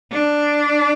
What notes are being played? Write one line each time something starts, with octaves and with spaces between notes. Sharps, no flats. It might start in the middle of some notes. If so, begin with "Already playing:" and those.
D4